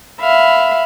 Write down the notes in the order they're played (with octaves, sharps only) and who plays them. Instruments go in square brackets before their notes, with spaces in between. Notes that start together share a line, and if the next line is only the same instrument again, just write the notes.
[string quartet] E5 F5 B5